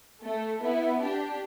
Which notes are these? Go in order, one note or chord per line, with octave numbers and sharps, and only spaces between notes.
A3
B3 E4
D4 G4